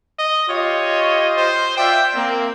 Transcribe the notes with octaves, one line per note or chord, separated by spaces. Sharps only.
D#5
F4 G4 C#5 D#5
C5
F4 D5 E5 G5
A#3 C4